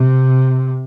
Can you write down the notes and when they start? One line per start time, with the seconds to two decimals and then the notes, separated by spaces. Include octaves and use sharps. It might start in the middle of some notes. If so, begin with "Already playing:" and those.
Already playing: C3